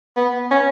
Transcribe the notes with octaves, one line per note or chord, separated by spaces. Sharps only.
B3
C#4